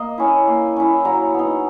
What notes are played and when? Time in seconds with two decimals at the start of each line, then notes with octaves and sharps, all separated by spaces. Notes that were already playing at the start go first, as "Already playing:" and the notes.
Already playing: A#3 D#5
0.18 C#4 E4
0.47 A#3
0.76 C#4 E4
1.05 F#3 A#5
1.34 B3 D#4